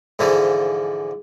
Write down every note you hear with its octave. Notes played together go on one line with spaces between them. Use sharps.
G#2 D3 E3 F3